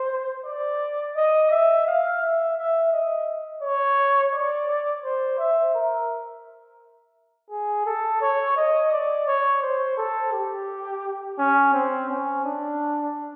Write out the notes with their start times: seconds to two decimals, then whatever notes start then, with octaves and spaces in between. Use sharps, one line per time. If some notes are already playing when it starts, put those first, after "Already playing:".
Already playing: C5
0.45 D5
1.16 D#5
1.51 E5
1.86 F5
2.21 E5
2.57 E5
2.92 D#5
3.62 C#5
4.33 D5
5.04 C5
5.38 E5
5.74 A#4
7.50 G#4
7.86 A4
8.21 C#5
8.56 D#5
8.92 D5
9.27 C#5
9.62 C5
9.97 A4
10.32 G4
11.38 C#4
11.73 C4
12.09 C#4
12.44 D4